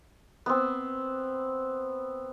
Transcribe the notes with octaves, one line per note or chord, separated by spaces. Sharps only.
B3 C4